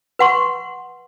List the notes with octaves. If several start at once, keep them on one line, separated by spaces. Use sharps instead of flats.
B4 F#5 C6 C#6